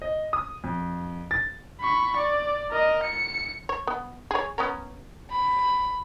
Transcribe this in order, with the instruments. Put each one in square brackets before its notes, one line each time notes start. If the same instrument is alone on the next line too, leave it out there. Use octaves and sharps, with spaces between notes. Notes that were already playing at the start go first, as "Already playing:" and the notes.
[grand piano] D#5
D#6
F2
A6
[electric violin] B5 C#6
D5
A#4 D#5
C#7
[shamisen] C#5
B3
G#4 C#5
B3 C#4 A#4
[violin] B5